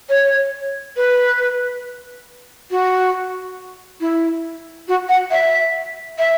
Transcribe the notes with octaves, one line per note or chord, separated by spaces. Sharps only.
C#5
B4
F#4
E4
F#4
F#5
E5
E5